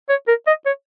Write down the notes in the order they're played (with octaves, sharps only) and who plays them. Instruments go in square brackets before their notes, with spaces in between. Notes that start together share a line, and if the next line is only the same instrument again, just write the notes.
[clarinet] C#5
A#4
D#5
C#5